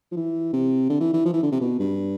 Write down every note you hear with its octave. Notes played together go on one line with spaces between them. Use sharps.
F3
E3
C3
D3
E3
E3
F3
E3
D3
C3
B2
G2